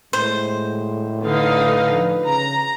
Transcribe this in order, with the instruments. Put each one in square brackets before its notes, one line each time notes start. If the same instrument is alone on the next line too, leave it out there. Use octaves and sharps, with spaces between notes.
[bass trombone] A2 [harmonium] G#3 [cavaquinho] C5
[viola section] D3 D#4 F5 [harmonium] B4
[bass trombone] F3
[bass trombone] C#3 [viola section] A#5